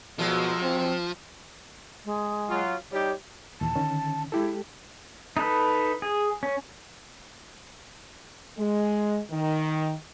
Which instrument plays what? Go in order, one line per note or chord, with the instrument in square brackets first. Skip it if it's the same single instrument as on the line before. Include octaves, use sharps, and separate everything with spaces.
[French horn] B2 [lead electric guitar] F3 [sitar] F#3 G#3 A3
[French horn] C4
[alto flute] G#3
[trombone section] F#3 F4
[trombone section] G3 D#4 G4 [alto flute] C#5
[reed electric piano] D#2 A#2 E3 [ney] A5
[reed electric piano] D3 D#3 C#4
[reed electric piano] G#3 G4 A4 [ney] E4
[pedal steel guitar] D#4 A4 B4
G#4
C#4
[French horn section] G#3
D#3